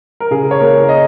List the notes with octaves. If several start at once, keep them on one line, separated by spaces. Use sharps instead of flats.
A#4
C#3 G#4
C#5
A#3 A#4
D#5